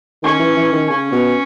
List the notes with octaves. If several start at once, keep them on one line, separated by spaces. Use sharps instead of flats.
D#3 C#4
E3
E3
D#3
C#3 C#4
B2